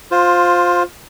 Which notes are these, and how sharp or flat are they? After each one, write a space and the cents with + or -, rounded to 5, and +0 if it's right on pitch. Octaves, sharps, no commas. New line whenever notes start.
F4 +15 C5 +0